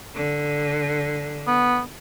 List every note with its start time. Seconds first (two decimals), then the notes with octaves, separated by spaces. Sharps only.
0.15 D3
1.47 B3